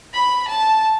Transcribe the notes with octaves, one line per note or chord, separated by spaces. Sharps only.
B5
A5